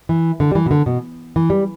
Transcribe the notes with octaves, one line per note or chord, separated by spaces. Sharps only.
E3
D3
G3
E3
B2
D3
B2
E3
G3